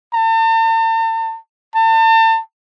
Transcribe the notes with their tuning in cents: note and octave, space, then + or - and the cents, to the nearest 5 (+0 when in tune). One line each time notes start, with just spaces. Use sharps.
A5 +45
A5 +35